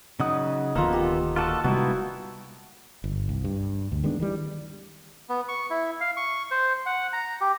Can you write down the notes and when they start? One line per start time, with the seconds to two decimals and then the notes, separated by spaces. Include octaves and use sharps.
0.20 C#3 F#3 D#4 F#5 D#6
0.75 D1 D#3 A#3 B3 F4 A4 A#5
0.93 G4
1.36 A#3 F4 F#4 A4 A5
1.64 C3 G3 G#3 B3 D#4 E4 F#4
3.04 G1
3.29 C2
3.44 G2
3.92 D2
4.04 D#3 G#3 B3 D4
4.20 D#3 E3 G3
5.29 B3
5.48 C#6
5.70 E4
6.01 F5
6.17 C#6
6.51 C5
6.86 F#5
7.13 A#5
7.41 G4